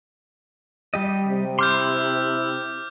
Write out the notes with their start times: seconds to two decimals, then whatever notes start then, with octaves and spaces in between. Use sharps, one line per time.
0.94 G3 G4 D#5
1.28 C3
1.59 E4 G5 C6 D6 F6 G6